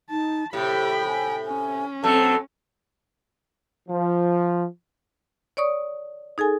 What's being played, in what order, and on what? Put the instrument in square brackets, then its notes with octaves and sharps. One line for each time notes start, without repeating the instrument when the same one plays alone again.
[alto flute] D#4 [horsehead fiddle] A5
[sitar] A2 C3 [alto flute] G4 [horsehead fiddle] G5 B5
[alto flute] G#5
[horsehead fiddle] C#4 [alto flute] G#5
[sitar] B2 F#3 A3 [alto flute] C4 [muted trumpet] A4
[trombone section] F3
[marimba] C#5 D5 C#6 D#6
D#4 G#4 A4 G#5